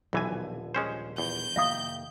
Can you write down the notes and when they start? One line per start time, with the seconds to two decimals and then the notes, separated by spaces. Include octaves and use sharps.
0.13 D#1 B1 D3 E3 F3 G#5
0.75 G#3 C#4 C5
1.18 E2 G6
1.56 F1 D#3 A#3 E5 F5 D#6